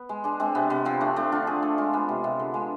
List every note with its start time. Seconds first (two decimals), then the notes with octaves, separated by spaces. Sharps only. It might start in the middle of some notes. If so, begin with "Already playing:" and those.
Already playing: B3
0.09 G#3
0.24 G#3 D4
0.40 G#3 C4
0.55 C3 B3
0.70 C3 B3
0.85 F3 C4
1.01 A3 D4
1.16 A3 D4
1.32 D3 F4
1.47 D3 G#4
1.62 A3 A4
1.78 G#3 F4
1.93 G#3 B3
2.09 C3
2.24 C3
2.39 D3
2.54 G#3